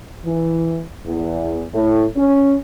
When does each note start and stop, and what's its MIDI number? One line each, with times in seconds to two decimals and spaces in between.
0.24 0.82 52
1.06 1.62 40
1.73 2.03 45
2.15 2.54 61